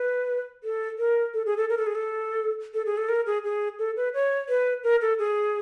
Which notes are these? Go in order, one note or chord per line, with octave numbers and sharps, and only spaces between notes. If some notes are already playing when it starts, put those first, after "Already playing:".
Already playing: B4
A4
A#4
A4
G#4
A4
A#4
A4
G#4
A4
A4
G#4
A4
A#4
G#4
G#4
A4
B4
C#5
B4
A#4
A4
G#4